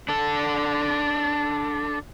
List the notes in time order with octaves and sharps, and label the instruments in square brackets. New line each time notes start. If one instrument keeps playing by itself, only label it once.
[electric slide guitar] D4 A4